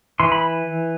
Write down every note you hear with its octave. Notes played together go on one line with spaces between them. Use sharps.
E3 C6
B5